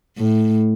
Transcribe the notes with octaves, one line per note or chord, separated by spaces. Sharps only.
A2